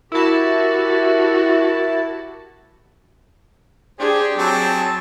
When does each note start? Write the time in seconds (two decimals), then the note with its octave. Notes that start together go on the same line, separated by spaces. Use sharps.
0.12 E4 F#4 G4 A#4 A5
3.99 D4 G4 G#4 C5
4.38 F#3 C4 G#4 A5